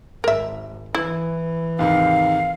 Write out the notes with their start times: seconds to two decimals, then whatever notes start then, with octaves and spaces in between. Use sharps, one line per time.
0.24 G#1 G#2 A#4 E5
0.95 E3 E4
1.79 D#2 G#2 C3 F5